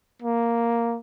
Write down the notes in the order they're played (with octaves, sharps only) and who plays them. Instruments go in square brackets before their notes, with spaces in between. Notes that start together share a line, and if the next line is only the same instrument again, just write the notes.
[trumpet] A#3